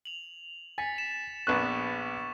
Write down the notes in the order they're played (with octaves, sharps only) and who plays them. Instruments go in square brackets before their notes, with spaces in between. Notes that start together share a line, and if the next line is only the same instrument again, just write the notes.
[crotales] F7 F#7
[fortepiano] G#5 [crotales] A6 B6 C#7
[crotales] E7
[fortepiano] A#1 B3 F#6 [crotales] C#6